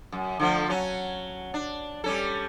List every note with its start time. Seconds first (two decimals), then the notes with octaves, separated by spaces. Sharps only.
0.12 F#2
0.39 D3 F3 A3
0.70 F#3 C#4
1.54 D4
2.04 G3 C#4 A4